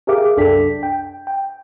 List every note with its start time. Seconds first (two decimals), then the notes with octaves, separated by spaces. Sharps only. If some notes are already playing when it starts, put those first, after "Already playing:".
0.07 G4 G#4 A#4 E5 F5 D6
0.37 C2 F#2 D4 A4 G5 B6
0.83 G5
1.27 G5